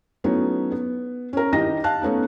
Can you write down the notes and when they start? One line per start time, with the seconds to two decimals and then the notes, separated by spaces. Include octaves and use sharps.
0.24 F#3 A3 B3 C#4 D#4 E4
0.72 B3
1.33 C#4 A#4
1.53 D#3 D#4 E4 G4 D#5 A#6
1.84 F5 A5 F#6
2.02 A3 B3 C#4 D#4